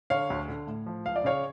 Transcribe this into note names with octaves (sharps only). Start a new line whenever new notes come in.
D3 C#5 F5
D2
D3
A2
F3
C#2 F5
D5
C#3 C#5 F5